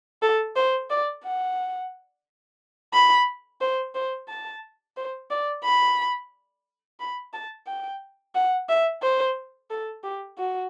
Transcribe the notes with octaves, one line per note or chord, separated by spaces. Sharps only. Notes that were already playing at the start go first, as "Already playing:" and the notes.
A4
C5
D5
F#5
B5
C5
C5
A5
C5
D5
B5
B5
A5
G5
F#5
E5
C5
A4
G4
F#4